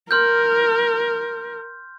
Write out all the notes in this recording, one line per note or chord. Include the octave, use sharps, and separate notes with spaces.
A#4 C6 F6 G6